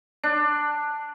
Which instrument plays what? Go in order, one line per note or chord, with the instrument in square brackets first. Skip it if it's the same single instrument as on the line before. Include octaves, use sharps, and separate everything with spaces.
[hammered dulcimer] D4